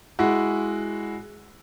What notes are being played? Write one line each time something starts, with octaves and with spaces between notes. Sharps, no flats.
G#3 E4 F#4